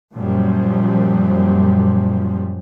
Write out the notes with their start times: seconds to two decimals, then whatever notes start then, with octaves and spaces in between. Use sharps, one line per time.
0.14 F#2 A#2 F3 G3